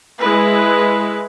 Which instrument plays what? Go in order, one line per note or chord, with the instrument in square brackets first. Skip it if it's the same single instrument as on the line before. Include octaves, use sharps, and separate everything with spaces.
[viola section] G#3 E4 B4